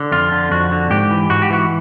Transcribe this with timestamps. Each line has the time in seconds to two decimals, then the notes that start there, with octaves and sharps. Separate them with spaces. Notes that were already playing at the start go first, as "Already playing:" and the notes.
Already playing: D3
0.12 F2 F4
0.32 D3
0.51 F2 F#4
0.71 D3
0.91 G#2 G4
1.11 E3
1.30 G#2 F#4
1.42 G4
1.50 E3 F#4